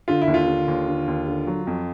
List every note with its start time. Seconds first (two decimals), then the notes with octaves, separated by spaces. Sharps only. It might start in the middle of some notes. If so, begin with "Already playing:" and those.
0.08 D3 F4
0.21 E4
0.28 D#2
0.34 F4
0.48 D3
0.68 D#2
0.88 D3
1.08 D#2
1.27 D3
1.47 F#3
1.67 F2